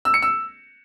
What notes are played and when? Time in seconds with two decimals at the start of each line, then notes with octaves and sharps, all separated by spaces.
0.05 E6
0.14 C#7
0.22 E6